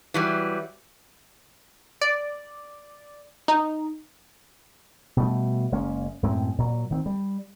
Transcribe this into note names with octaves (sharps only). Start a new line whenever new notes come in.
E3 F#3 G3
D5
D#4
B2 G3 A3
F#1 G#3 A#3 C#4
F#2 A2 G#3 C4
A#2 F#3
D#3 B3 C4
G3